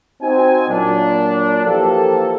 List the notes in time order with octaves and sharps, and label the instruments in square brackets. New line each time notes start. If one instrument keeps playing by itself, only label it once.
[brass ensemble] C4 D#4 F#4 G#5
A#2 F#3 D4
E3 F3 A#3 F4 G4 A4